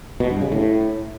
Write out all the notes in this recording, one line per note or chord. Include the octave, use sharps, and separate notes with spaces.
B2
G2
C#3
A2